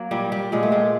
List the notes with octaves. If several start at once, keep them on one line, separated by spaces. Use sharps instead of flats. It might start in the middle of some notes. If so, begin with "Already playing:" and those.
Already playing: F#3 A#3
A#2 G3
G3
A#2 G#3
A3
G#3